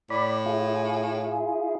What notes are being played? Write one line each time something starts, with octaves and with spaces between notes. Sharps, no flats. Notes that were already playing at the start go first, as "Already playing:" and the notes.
A2 D5 B5
E4 F4 G#4